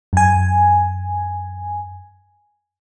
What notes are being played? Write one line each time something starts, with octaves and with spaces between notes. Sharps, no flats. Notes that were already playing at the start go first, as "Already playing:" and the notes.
F#2 G#5